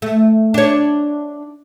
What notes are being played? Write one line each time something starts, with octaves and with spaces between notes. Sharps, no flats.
A3
D4 C#5